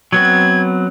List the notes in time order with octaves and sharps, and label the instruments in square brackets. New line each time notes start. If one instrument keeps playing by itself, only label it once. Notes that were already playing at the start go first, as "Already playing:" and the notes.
[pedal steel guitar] F#3 B3 C4 [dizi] G#6